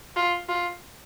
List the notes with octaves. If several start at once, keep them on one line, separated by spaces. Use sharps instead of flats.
F4
F4